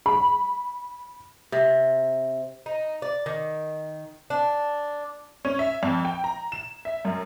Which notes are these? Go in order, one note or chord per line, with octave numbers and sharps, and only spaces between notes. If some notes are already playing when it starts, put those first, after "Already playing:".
B5
C3
D#4
D5
D#3
D4
C#4
E5
F2
G5
A#5
E7
E5
F#2